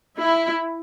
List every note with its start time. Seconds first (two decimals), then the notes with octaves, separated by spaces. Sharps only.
0.19 E4